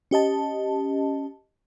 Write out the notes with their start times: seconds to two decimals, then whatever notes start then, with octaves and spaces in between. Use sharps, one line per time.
0.11 C#4 G4 D#5 A5